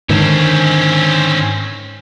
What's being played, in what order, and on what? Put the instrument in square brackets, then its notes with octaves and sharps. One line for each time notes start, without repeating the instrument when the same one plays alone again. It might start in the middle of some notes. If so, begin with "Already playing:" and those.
[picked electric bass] G#2 D3 D#3 [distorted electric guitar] C4 C#4